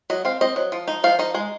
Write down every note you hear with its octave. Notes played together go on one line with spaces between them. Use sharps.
F#3 D#5
C4 F5
C4 D#5
F#3
F3
D#4
F3 F5
D#4 D#5
G#3